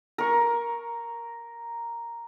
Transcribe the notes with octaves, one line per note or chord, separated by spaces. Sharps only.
A#4 C#6